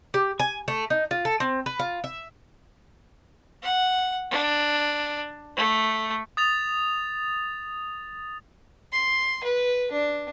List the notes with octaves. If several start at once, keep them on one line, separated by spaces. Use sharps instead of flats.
G4
G#5
A3
D#4
F4
A4
C4
B4
F4
E5
F#5
D4
A3
D#6 A6 F7
C6
B4
D4